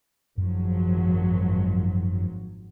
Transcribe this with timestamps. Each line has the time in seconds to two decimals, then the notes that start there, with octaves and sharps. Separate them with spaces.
0.38 G#1 F#2 F3 F#3